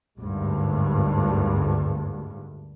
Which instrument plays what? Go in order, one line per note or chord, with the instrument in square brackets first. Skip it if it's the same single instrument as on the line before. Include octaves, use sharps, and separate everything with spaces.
[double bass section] G#1 D2 G2